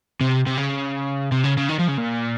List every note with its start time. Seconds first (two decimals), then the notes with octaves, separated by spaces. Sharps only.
0.21 C3
0.47 C3
0.57 C#3
1.32 C3
1.44 C#3
1.58 C#3
1.69 D#3
1.79 F3
1.88 C#3
1.98 A#2